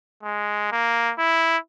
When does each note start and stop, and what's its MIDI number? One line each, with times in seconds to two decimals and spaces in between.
0.23 0.69 56
0.72 1.13 58
1.18 1.58 64